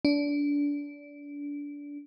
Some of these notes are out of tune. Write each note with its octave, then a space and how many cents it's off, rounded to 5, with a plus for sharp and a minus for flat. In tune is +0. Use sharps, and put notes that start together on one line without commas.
D4 -25